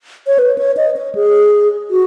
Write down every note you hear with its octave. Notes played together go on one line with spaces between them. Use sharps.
C#5
B4
C#5
D#5
C#5
G#4
F#4